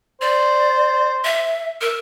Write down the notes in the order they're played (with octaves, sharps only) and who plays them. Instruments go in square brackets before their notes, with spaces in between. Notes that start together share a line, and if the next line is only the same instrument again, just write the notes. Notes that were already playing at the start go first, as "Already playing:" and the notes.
[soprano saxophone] C5 [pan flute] D5
[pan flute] E5
[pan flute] A#4 [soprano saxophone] E5